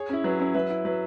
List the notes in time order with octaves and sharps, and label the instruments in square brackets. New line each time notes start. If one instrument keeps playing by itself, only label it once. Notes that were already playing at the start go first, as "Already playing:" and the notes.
Already playing: [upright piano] G#4 C#5
C#4 E4
F#3 B4
C#4 E4
F#3 B4 E5
E4
F#3 B4